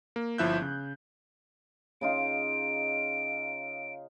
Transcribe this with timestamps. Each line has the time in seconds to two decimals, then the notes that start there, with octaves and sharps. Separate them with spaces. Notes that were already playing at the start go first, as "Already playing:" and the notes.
0.16 A#3
0.38 G1 F3 E4 E5 F#6 G6
0.62 C#3
2.01 C#3 D#4 F4 D7